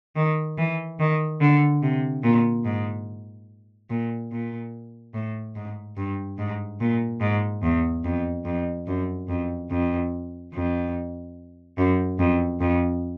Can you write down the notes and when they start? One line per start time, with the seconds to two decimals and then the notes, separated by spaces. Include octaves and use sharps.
0.16 D#3
0.58 E3
0.99 D#3
1.41 D3
1.82 C3
2.23 A#2
2.65 G#2
3.90 A#2
4.31 A#2
5.14 A2
5.55 G#2
5.97 G2
6.38 G#2
6.80 A#2
7.21 G#2
7.63 E2
8.04 F2
8.45 F2
8.87 F#2
9.28 F2
9.70 F2
10.53 F2
11.78 F#2
12.19 F2
12.60 F2